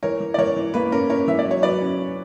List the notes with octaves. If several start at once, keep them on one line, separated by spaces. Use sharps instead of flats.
E3 A#4 C#5
E3
D5
E3 A#4 C#5
E3
A#3 B4
C#4 A#4
C#4 A#4 C#5
E3 E5
D5
F#3 C#5
F#3 B4 D5
C#4
C#4